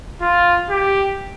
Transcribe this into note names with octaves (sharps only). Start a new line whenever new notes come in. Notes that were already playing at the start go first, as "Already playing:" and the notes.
F4
G4